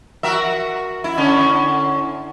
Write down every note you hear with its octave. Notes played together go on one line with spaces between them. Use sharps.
F#4 A#4 E5
E4
D3 C#4 E4